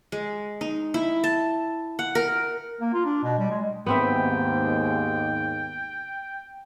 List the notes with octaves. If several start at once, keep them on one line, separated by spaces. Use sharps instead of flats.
G#3
D#4
E4
A5
F#5
A#4
A#3
F4
D4
B2
G3
G#3
D#2 G#2 B3 C4 E5 G5